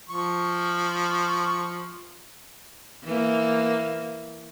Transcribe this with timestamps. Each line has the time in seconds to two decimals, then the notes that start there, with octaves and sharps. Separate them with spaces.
0.09 F3 C#6
3.04 E3 A#3